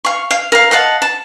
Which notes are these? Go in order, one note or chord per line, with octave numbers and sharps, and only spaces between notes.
F5 C#6
F5
A#4 F5
D#5 F5 F#5 A5
A5